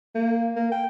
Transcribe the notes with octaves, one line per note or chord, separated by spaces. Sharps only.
A#3
A#3
G5